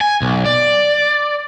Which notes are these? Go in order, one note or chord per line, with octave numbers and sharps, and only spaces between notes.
G#5
B1
D5